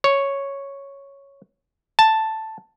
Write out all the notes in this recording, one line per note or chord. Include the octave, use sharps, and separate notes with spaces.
C#5
A5